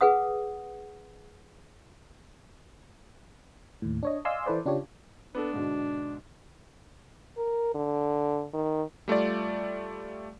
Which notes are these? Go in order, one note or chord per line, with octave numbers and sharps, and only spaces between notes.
G#4 B4 F#5 D#6
D#2 A2
D4 C#5 D#5
D5 D#5 F5 G#5 C6 E6
E3 E4 A4 B4 C5 D5
C#3 D4 F4 G4 C#5
B3 D4 A4
G#2 B2 D3
A#4
D3
D#3
G3 A3 F4 D5